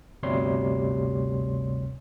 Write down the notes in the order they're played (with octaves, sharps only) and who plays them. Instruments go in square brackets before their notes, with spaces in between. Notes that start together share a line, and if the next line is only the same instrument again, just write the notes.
[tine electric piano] G1 D2 C3 G3 C#5 C6